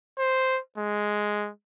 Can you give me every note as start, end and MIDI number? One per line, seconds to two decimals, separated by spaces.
0.18 0.59 72
0.78 1.50 56